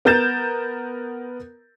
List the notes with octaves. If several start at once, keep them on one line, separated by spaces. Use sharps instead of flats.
B3 A#4 A#5 G6 A6 E7